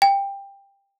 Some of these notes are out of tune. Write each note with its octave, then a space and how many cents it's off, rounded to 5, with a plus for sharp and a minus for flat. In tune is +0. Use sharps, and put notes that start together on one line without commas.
G5 +15